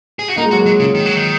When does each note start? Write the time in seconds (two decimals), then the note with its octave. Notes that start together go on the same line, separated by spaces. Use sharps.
0.19 G#4
0.28 F#4
0.37 A#3 D#4
0.45 G#3
0.51 F#3 F#4
0.61 F#3 G#3
0.80 C#3
0.95 D#3
1.06 F#3
1.16 D#3